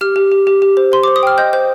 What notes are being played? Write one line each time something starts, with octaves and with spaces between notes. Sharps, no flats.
G4 F6
G4
G4
G4
G4
C5
C5 C6
C5 D6
D#6
G5 F6
D#5 G6
C5 G6